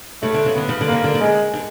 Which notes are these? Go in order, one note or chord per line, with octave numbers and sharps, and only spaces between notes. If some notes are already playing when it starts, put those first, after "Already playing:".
C#3 A3
D3
C#3
D3 B3
C#3
D3
C#3 A#3
D3
C#3
G#3
D3